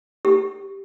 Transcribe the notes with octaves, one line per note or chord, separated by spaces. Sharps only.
G4